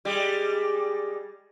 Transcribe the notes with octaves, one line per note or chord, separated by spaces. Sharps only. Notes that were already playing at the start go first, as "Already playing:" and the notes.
G3 G#3